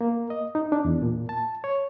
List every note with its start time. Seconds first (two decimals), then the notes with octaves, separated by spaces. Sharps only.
0.01 A#3
0.30 D#5
0.55 D#4
0.72 D4
0.85 E2
1.02 A#2
1.29 A5
1.64 C#5